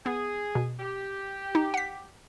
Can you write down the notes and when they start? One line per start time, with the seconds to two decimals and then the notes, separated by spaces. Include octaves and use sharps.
0.06 B3 G#4
0.55 B2
0.80 G4
1.55 D#4
1.74 F#5 B6